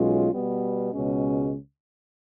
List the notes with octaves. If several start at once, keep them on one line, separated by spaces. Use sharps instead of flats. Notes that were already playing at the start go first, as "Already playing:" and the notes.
Already playing: B1 B2 G#3 C#4 F4
B2 G3 B3
C#2 B2 G#3 C#4